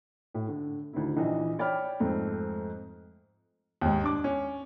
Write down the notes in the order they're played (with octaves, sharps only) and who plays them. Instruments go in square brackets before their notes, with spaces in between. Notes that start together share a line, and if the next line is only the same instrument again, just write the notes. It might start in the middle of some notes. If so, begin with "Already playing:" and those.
[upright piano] A2
D3
D2 D#3 E4
A#1 E3 D#4
C#5 D5 G5 B5 F6
F2 G#2 A3 C4
[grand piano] D#2 G#2
D4 D6
C#4